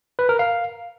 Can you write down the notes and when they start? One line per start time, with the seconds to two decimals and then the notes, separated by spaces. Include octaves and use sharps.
0.19 B4
0.29 A#4
0.39 F5